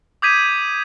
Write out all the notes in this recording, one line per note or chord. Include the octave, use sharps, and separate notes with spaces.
D6 D#6 G6 G#6 B6 D#7